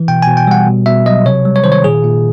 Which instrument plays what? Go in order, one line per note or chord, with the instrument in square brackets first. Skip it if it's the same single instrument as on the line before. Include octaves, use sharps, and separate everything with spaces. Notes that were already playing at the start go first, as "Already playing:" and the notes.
Already playing: [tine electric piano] E3
B2 G5
B2 G#5
G5
G3 F#5
B2
B2 E5
F#3 D#5
C3 C#5
G3
C#5
D#3 C5
C#5
A#2 G#4
A#2